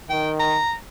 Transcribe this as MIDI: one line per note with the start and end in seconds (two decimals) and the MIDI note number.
0.10 0.57 51
0.10 0.30 79
0.40 0.74 82